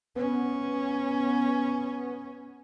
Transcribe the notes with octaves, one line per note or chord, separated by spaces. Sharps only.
B3 C#4